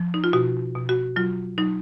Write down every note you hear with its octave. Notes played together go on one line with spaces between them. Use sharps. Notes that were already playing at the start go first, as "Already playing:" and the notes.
Already playing: F3
D#4
F4
B2 F#4
B2
F#4
F#3 F4
F#3 D#4